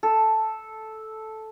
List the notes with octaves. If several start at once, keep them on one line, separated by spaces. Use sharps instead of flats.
A4